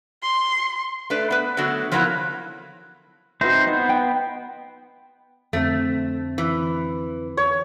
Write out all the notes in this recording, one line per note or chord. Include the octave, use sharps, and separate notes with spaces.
C6
A3 D4 B4
B3 B4
D3 F#3 A3 B3 F#4
F3 F#3 A#3 B3 D#4 E4
C4 D#4 F#4 B4 C5 E5
B3 D#4
G5
F2 D3 A3 C4
E3
C#5